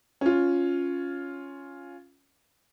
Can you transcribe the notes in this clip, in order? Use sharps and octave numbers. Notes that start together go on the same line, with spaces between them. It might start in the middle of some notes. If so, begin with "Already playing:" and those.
C#4 F4